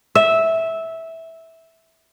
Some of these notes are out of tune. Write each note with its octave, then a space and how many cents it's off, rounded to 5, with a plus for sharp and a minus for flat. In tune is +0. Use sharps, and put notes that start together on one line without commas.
E5 -10